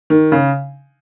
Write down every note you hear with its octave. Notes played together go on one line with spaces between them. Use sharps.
D#3
C#3